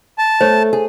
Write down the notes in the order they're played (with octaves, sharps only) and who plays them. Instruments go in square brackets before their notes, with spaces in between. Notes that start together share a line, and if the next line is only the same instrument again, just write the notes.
[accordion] A5
[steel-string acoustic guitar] A3 [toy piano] C5 C#5
[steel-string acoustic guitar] G#4